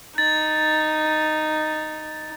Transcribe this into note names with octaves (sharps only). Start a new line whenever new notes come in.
D#4 A6